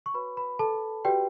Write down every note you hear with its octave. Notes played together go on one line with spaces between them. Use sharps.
C#6
F#4 B4 C#5 B5
B4 B5
A4 A5
F#4 G4 B4 D5 G5